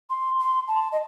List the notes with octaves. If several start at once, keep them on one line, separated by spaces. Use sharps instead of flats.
C6
C6
A5
D#5